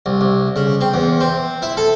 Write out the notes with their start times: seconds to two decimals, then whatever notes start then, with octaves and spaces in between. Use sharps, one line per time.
0.06 C2
0.21 C2
0.56 C#3
0.81 C4
0.94 E2
1.20 C4
1.62 E4
1.77 A4